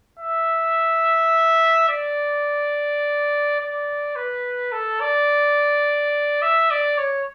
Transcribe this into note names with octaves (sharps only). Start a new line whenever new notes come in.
E5
D5
D5
B4
A4
D5
E5
D5
C#5